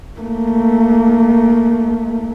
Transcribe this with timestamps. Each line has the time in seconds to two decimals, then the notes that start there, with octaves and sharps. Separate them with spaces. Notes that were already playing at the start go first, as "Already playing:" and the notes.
0.21 A3 A#3